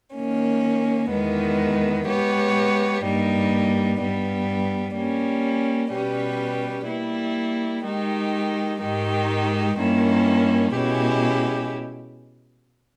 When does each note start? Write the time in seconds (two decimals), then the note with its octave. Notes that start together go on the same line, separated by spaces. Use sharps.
0.14 D#3 A#3 C#4
1.11 E2 D#3 G#3 B3
2.07 G#3 B3 G4 C#5
3.04 G2 G3 A#3 D#4
4.00 G2 G3 B3
4.95 G3 A#3 C#4
5.93 B2 G3 C#4 G4 B4
6.89 G3 A#3 E4
7.85 D#3 G#3 D#4 G4
8.81 G#2 D#3 G#3 D#4 G4
9.77 G2 D#3 A#3 C#4 E4
10.74 B2 G#3 C#4 E4 G4